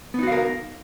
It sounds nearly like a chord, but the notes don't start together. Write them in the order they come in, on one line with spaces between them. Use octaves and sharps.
B3 D#4 F#4 F5 A#4